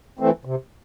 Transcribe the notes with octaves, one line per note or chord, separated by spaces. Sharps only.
E3 A3 C4
C3